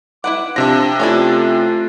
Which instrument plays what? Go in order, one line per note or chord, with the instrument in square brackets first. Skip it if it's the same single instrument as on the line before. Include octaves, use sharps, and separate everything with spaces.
[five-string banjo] E4 B4 F#5 [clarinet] D6
[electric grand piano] C3 A#6 [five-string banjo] F3 E5 [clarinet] D4
[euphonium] A3 [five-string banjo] C#4 D4 E4 [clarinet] F4